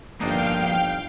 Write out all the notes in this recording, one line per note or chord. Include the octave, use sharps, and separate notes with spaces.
G1 F2 A#3 D4 D#4 F5 G5